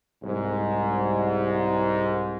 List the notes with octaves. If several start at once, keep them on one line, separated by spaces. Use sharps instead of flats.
C2 G#2